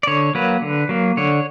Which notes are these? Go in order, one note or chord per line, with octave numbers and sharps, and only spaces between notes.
D5
D3 C#5
F#3 A#3 B4
D3
F#3 A#3
D3 C#5